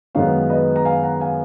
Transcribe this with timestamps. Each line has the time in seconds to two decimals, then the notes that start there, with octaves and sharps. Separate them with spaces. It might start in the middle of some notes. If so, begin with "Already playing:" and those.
0.15 F#2 D#3 G#3 B3 C#5 F5
0.49 B4 D#5
0.76 A#5
0.85 F5 G#5
1.03 F#5 A#5
1.21 F5 G#5